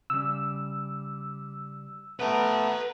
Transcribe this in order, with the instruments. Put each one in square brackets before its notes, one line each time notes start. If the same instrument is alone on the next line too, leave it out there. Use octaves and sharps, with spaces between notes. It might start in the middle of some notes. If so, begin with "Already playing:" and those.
[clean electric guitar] C#3 G3 [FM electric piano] E6
[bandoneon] A3 B3 [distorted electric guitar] B4 A#5